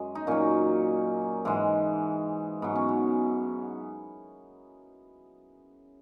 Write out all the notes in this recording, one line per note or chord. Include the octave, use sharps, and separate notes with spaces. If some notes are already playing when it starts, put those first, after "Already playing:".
Already playing: F#2 G#3 D#5
D#4
A#2 F#3 C#4
G#2 E3 G#3
G#2 F#3 B3
C#4
B3